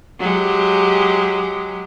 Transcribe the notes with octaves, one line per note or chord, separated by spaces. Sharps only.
F#3 G#3 G4